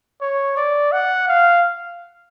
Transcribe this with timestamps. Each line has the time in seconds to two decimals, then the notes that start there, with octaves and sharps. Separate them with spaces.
0.21 C#5
0.57 D5
0.92 F#5
1.28 F5